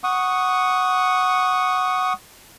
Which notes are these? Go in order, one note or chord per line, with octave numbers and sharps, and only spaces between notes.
F#5 C#6 D#6